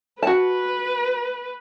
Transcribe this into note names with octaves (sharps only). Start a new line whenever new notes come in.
F#4 B4 A5